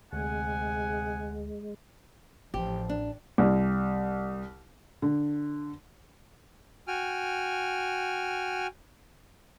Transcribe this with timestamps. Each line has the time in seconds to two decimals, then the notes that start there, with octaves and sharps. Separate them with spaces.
0.13 D2 C3 G#3 G#4 F#5 G#5
2.54 A1 F3 G4
2.89 D4
3.38 C2
5.02 D3
6.88 F#4 G5 G#5 F6